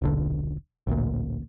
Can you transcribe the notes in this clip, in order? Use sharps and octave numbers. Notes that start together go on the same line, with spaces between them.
D#1 B1 D3
A1 D2 A#2